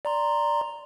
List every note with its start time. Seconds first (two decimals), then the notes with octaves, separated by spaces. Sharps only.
0.05 D5 A#5 C6